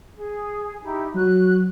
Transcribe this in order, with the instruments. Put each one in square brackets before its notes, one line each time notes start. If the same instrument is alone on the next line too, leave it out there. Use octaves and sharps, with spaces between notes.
[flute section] G#4
D#4 E4 G4
[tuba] F#3 [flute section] F#4 F#6